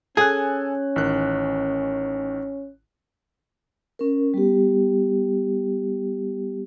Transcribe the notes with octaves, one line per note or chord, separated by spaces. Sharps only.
C#4 G#4 A4 G#5 F#6
A1 D#3 F#6
C#4 A#4
G3 B3 G4